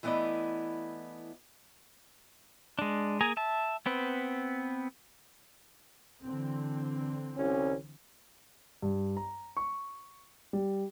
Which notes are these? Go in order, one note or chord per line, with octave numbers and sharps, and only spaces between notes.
E3 A3 B3 E4 D5 D#5
G#3 D4
A#3 G#4 G#5 A#5
E5 A5
B3 C4 B4
D3 E3 C4
C2 C#4
G2
A#5
C#6
G3